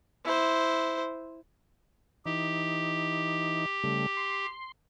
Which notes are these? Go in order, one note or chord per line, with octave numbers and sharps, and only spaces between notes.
E4 C5
E3 D#4 G4
C#3 G3 A3
C6